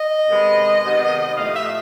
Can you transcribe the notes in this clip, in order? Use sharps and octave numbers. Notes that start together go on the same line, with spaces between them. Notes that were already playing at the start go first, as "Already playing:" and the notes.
Already playing: D#5
C3 D#3 G#3 B3
C3 D#3 G#3 B3
A2 F3 A3 F5
D#5
E5